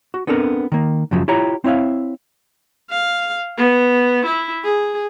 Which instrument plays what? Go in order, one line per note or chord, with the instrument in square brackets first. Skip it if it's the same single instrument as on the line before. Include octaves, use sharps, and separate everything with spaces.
[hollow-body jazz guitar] F#4
B3 C4 D4 A4 A#4
D#3 A#3
F#2 C#3 F3 F#3
E4 F4 G4 C#5 A#5
C4 E4 C#5 E5 F5
[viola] F5
B3
E4
G#4